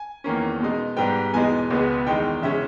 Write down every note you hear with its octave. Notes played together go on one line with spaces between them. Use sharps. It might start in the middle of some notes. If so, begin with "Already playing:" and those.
Already playing: G#5
E2 D#3 A#3 C#4
B2 G#3 D#4
G#2 G3 B3 G5
E2 B2 G#3 D#4 G#5
C#2 B2 G#3 B3
E2 D#3 G#3 D#4 G5
E2 C#3 G#3 C#4 E5